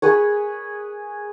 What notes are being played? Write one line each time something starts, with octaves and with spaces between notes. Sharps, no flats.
G#4 B4 C#5